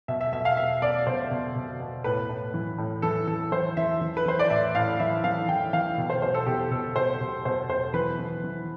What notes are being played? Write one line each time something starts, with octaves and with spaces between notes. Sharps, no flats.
B2 E5
E5
B2 E5
F5
B2 E5
B2 D5
B2 C5
B2
B2
B2
A2 B4
A2
E3
A2
E3 A4
E3 A4
E3 C5
E3 E5
E3
B4
E3 C5
D5
A2 E5
A2 F5
E3 E5
E3 F5
E3 G5
E3 F5
B2
C5
B2 C5
A4
B2 G4
B2 A4
B2 C5
B2
B2 C5
B2 C5
E3 B4
E3
E3